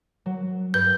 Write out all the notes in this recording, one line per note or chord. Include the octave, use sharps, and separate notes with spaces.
F#3
G2 B4 G6